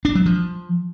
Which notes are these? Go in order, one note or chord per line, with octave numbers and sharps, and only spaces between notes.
D4
F#3
F3